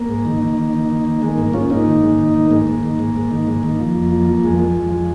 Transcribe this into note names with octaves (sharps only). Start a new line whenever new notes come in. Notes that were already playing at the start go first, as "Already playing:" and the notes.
Already playing: A#3
G#2
D#3
D#3
D#3
D#3
D#3
D#3
D#3 G#3
G#2 A#3
G#2 C#4 F4
G#2 A#3 D#4
D#3
G#2
D#3
D#3
G#2 A#3
G#2
D#3
G#2
G#2
D#3
G#2
D#3
F3
F2
F3
F3
F2 G#3
F3
F2
F3